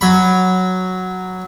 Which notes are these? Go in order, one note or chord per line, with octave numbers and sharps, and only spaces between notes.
F#3 B5